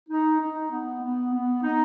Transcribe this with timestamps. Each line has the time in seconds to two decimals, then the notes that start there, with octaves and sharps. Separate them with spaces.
0.09 D#4
0.40 D#4
0.70 B3
1.02 B3
1.33 B3
1.63 D#4